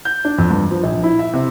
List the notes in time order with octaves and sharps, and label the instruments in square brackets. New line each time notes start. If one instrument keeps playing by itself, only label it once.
[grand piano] G6
D4
F2
G2
F3
A#1
E4
E5
C3